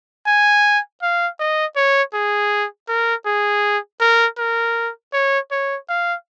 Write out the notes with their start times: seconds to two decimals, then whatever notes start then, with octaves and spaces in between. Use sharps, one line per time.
0.27 G#5
1.02 F5
1.39 D#5
1.76 C#5
2.14 G#4
2.89 A#4
3.26 G#4
4.01 A#4
4.38 A#4
5.13 C#5
5.51 C#5
5.89 F5